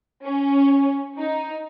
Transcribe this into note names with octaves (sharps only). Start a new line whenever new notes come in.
C#4
D#4